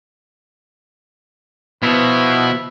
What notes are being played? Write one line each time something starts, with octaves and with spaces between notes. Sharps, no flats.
B2 F3 E4 B4